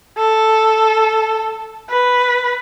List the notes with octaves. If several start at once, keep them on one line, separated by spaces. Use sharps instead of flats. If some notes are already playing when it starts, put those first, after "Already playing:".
A4
B4